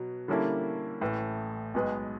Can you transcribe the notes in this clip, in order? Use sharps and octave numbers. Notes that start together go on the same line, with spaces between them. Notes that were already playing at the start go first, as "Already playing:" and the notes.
Already playing: B2 F#3 B3
D3 G3 A#3 C#4 E4
A1 A2 E3
B1 B2 G#3 B3